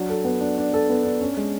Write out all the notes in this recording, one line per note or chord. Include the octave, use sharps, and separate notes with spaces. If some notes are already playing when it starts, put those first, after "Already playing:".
Already playing: F#3 D4
A4
B3
D4
D4
A4
B3
D4
C#4
G#3